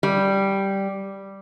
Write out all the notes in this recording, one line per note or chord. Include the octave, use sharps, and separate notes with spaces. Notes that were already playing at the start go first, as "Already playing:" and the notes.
G3